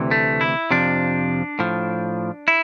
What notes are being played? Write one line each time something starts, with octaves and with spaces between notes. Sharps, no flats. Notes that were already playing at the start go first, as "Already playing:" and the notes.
Already playing: D2 C3 E3
A3
E4
F2 C3 F3 D4
A2 F3
E4